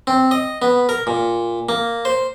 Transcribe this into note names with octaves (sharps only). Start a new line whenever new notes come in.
C4
D#5
B3
A#4
A#2
A#3
C5